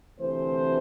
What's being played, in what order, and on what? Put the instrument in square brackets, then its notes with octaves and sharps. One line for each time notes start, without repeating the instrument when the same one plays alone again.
[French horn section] D2 C3 E3 A3 C5